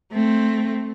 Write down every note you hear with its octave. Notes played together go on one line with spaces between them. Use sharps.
A3 C4